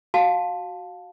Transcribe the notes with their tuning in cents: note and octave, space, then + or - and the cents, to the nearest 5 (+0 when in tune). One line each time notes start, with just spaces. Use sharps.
F#4 +0 F5 +20 A5 +0